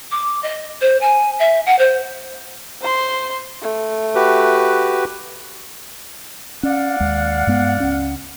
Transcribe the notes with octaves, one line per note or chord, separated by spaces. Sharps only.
D6
D#5
C5
G#5
E5
F#5
C5
C5 C6
A3
F#4 G4 B4
C#4 D5 F5 F#5
D#2 G#3
G2 G#3 B3
C#2 C#4